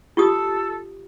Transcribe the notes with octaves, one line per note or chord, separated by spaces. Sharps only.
F4 G4 A4 D#6